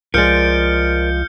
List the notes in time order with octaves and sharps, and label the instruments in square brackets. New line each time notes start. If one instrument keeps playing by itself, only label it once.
[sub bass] C2 [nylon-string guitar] F3 G#3 [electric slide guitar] A#4 D5 [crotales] F6 G6 C#7